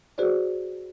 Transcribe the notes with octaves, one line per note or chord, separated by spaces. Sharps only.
F#4 G#4 B4 C5 D5